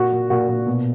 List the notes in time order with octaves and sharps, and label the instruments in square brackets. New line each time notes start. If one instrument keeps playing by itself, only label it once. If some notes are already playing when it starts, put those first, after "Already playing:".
Already playing: [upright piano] A#2 F#4
A#2
A#2 F#4
A#2
B2